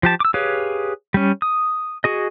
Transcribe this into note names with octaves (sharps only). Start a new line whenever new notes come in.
F3 G4 A5
D6 E6
G4 G#4 B4 C#5 F5
G3 C#4
D#6
F#4 G#4 D#5